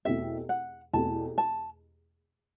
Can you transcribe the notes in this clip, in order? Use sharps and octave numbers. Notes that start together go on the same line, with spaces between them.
E2 B2 A3 C4 G4 E5
F#5
E2 B2 A3 C4 G4 A5
A5